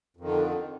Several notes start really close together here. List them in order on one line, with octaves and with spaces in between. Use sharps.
F2 D#3 D3